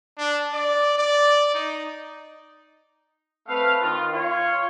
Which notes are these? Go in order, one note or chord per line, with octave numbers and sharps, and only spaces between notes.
D4
D5
D5
D#4
A3 C4 B4 F5
D#3 F4
F4 C#5